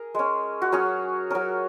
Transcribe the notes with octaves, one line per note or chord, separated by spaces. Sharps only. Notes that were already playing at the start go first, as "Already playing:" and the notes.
Already playing: G#4 A#4
G#3 C#4
F#4
F#3 C#4 G#4
F#3 C#4 A#4